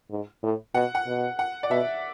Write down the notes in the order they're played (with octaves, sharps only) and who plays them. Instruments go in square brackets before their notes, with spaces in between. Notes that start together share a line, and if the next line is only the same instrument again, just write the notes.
[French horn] G#2
A2
[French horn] B2 [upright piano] F#5
[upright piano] F#5
[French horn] B2
[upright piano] F#5
D5
[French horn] B2 [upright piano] E5